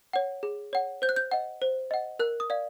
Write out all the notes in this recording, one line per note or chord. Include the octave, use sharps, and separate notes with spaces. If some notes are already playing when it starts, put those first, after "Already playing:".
C#5 F#5
G#4
C#5 F#5
C5 G6
F#6
G6
D#5 F#5
C5
D#5 F#5
A#4 F#6
D#6
D5 F5